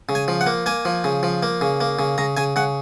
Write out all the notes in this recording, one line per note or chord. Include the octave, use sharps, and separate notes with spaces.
C#3
G#5
F3
F#5
A#3
A#3 G#5
F3
C#3
F3
A#3
C#3
A#3
C#3
C#3 A#5
C#3 G#5
C#3 F#5